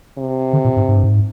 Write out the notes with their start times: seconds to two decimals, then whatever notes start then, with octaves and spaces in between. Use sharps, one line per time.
0.18 C3
0.53 D3
0.65 A#2
0.77 G#2
0.88 G#2
0.96 G2
1.04 G#2